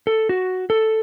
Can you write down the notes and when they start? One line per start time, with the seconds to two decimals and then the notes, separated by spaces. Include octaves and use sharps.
0.07 A4
0.29 F#4
0.70 A4